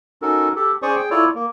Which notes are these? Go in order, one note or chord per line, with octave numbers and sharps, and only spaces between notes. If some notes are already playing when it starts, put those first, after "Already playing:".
C#4 D#4 F#4 A4 A#4
G4 A4
C#4 G#4 C5 D5 C#6 D#6
G#4 G5
E4 F4 A4 C#5 D5
A#3